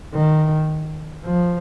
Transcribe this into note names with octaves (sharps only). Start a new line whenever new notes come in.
D#3
F3